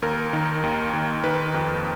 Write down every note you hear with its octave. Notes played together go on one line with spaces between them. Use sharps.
D#2 A#4
D#3
D#2
D#2
D#3 B4
F2